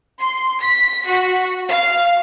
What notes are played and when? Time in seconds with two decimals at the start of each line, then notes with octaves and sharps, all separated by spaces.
0.19 C6
0.61 B6
1.05 F#4
1.67 F5